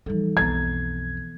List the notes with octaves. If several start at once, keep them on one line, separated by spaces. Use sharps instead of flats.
E3 F3 G3 D#4 A4
B1 F2 B3 A#5 G#6 A6